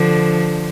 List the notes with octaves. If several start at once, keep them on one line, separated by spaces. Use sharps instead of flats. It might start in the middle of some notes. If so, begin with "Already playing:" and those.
Already playing: D3 F3